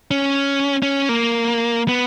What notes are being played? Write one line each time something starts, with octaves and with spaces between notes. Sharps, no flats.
C#4
C#4
A#3
B3